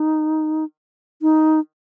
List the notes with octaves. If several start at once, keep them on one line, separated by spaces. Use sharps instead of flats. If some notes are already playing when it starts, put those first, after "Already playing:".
Already playing: D#4
D#4